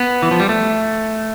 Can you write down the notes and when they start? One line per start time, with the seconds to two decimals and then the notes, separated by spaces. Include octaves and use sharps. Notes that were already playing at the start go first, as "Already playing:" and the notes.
Already playing: B3
0.22 E3
0.31 F3
0.40 G3
0.49 A3